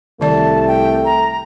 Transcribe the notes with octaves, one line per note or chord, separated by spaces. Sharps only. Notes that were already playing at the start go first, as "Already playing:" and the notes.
C2 D#3 A3 D5 A5
G5
A#5